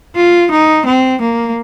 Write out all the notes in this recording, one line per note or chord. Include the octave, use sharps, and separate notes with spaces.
F4
D#4
C4
A#3